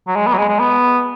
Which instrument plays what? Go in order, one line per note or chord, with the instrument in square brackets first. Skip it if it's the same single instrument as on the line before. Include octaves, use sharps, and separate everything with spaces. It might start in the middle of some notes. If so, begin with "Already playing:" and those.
[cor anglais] F#3
G#3
B3
F#3
G#3
G#3
B3